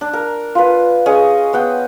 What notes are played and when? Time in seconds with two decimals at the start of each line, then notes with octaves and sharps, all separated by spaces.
0.01 D4
0.13 A#4
0.55 F4 B4
1.06 C#4 G#4 D#5
1.53 B3 F#5 G5